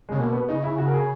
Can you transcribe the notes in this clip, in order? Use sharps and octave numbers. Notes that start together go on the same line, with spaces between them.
C#3 G#3
B2 A#3
B3
C#3 D#4
E4
F#4
A#4
G#4